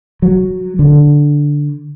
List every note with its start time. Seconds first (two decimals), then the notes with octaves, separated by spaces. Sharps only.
0.22 F#3
0.79 D3